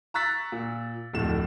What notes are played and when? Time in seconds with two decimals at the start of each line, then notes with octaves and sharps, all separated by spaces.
0.14 A#5 C#6 E6 F#6 A6 B6
0.52 A#2
1.13 D1 F2 A2 E7